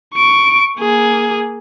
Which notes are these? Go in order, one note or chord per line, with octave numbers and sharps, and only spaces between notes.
C#6 D7
A#3 G#4